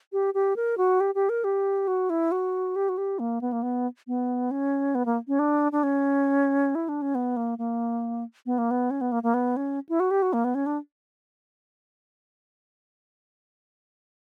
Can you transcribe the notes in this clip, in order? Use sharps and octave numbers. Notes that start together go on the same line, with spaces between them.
G4
G4
A#4
F#4
G4
G4
A#4
G4
F#4
E4
F#4
G4
F#4
G4
A#3
B3
A#3
B3
B3
C#4
B3
A#3
C#4
D4
D4
C#4
E4
D4
C#4
B3
A#3
A#3
B3
A#3
B3
C#4
B3
A#3
A#3
B3
C#4
E4
F#4
G4
F#4
A#3
B3
C#4
D4